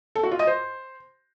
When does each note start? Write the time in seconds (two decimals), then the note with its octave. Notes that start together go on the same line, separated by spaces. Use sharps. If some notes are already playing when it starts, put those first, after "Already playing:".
0.15 A4
0.23 F#4
0.31 F4
0.39 D#5
0.47 C5